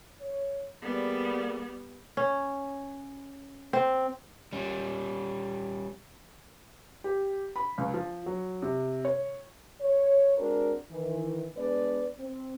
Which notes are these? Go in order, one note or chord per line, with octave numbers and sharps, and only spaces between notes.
C#5
G3 A#3 B3 G#4 D5
C#4
C4
G3 C#4
G4
B5
C#2
F3
F#3
C3
C#5
C#5
G#3 C4 D4 F#4 A#4
D#3 E3
G#3 B3 D4 B4 D5
C4